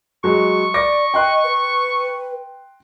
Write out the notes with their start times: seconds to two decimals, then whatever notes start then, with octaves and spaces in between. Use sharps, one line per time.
0.24 F#3 G#3 C#6
0.74 D5 D6 A#6
1.14 D#5 G5 C6 F#6
1.44 B4